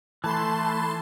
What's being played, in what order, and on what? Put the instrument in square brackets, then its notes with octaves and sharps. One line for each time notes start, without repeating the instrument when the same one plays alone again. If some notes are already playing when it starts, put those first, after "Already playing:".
[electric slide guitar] E3 [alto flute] A3 [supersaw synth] A5 C6 [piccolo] B5